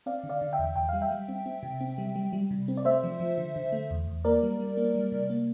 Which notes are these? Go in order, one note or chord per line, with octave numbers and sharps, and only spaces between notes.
C4 D5 F5
D3
D5 F5
D3
E5 G5
E2
E2 G5
G3 F5
E5 G5
G3
C4
C4
C3
C4
G3
G3
G3
C3
C4
D5
A3 C5 E5
F3
F3
D3
D3
A3
E2
E2
A#3 A#4 D5
G3
G3
A#3
G3
C3
A#3